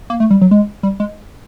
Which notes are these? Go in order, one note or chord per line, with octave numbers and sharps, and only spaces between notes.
A#3
A3
G3
F#3
G#3
G3
G#3